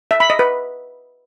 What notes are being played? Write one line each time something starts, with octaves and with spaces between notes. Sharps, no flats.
E5
B5
D#5
B4